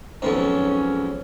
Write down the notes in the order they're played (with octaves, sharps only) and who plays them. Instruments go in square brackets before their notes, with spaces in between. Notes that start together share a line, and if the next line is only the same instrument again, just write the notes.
[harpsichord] B1 F2 G#2 [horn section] C#4